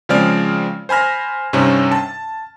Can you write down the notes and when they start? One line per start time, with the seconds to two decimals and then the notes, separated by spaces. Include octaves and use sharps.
0.09 C#3 F3 G#3 C4 D5 F6
0.89 C5 G#5 B5 F6 A#6
1.53 G2 C3 C4 C#4 D#4
1.91 A5